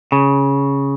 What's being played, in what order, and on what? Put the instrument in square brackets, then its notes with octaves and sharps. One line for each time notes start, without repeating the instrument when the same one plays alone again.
[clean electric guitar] C#3